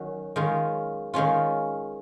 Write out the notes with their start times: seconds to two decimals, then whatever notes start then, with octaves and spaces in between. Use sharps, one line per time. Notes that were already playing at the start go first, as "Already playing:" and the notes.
Already playing: D#3 F#3 C#4 F#4
0.36 D#3 G#3 C#4 F4
1.14 D#3 G#3 C#4 F4